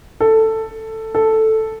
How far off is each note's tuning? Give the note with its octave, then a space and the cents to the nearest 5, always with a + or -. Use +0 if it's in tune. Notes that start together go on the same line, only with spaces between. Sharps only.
A4 +10
A4 +0